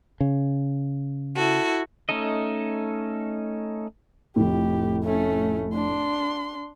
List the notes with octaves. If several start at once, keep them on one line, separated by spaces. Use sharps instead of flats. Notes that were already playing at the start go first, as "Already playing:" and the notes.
C#3
E4 F#4 A4
A3 C#4 D#4 A4 D#5
F1 A2 G4
A3 C#4
D4 C6